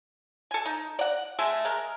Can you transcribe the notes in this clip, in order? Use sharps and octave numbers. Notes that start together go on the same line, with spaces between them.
A4 G#5
D#4
D5 F#5
G#3 A3 E5 G#5
G#3 A#4